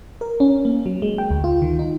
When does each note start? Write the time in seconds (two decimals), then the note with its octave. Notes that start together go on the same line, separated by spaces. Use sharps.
0.21 A#4
0.40 C#4
0.65 A#3
0.86 F#3
1.02 G#3
1.18 G5
1.30 D2
1.44 F4
1.62 D#3
1.79 D#4